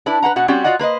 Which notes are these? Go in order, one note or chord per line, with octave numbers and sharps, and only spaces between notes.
D4 E4 B4 D5
B4 C5 F#5 A#5
B2 F#4 F#5
G3 C4 C#4 F#4 G4 D5
F4 F#4 D5 D#5 F#5
A#3 B4 C5 D#5